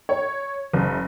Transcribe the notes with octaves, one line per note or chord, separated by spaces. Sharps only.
C#5
F#1